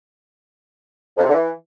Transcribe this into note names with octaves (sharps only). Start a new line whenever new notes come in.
F2
C3
D3
E3